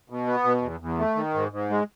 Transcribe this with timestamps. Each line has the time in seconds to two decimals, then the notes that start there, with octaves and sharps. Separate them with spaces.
0.10 B2
0.27 B3
0.44 B2
0.62 E2
0.80 E2
0.98 A3
1.15 D#3
1.34 G#2
1.52 G#2
1.70 G#3